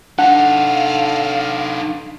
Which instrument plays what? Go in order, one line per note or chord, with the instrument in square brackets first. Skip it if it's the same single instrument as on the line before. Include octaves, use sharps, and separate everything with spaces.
[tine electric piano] D4 [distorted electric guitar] D#4 A4 [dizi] F5 [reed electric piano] F#5